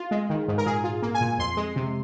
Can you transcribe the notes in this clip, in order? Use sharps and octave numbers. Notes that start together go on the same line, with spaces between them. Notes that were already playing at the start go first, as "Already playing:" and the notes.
Already playing: F4
G#3
D#3
G#2
A#4
A#2 G#4
F4
A#3
G#5
A#2
F2 C6
G#3
C3